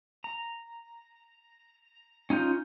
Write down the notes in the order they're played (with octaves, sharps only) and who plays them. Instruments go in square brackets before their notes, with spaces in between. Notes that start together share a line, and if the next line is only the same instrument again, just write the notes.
[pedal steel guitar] A#5
C#4 D#4 F4 G6